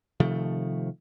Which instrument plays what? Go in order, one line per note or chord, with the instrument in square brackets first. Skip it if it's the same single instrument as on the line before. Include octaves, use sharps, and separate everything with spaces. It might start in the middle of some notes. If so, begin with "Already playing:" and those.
[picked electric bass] C3 D#3 F3 A3